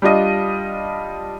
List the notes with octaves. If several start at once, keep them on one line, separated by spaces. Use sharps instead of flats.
G3 D4 F4 D#5